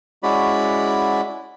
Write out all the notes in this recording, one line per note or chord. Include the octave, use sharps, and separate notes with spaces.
G#3 C#4 E4 F#4 D5 B5